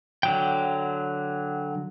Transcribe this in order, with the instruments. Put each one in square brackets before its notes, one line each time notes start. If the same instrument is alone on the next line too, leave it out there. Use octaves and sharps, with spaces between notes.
[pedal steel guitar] D3 F#3 G5